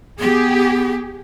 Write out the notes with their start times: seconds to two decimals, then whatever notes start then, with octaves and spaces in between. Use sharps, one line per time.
0.20 B3 G4 G#4